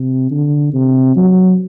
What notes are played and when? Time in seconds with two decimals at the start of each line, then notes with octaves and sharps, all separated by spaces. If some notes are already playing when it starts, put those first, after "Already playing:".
Already playing: C3
0.31 D3
0.74 C3
1.16 F#3